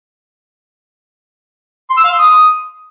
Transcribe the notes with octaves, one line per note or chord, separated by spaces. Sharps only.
C6
E6
F5
C6
D#6